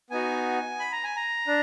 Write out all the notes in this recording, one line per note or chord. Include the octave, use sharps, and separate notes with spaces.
B3 D#4 F#4 G#5
B5
A#5
G#5
A#5
D4